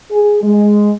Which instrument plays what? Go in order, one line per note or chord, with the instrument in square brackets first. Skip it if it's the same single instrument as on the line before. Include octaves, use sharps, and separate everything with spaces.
[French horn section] G#4
G#3